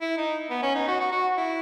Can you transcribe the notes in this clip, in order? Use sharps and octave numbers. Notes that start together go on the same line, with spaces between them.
E4
D#4
B3
C#4
D#4
F#4
F#4
F#4
E4